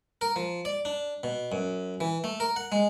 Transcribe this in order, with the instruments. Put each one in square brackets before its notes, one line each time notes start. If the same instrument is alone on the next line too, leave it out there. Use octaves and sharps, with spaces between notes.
[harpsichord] A#4
F3
D5
D4
B2
F#2
E3
A3
A#4
F#5
G#3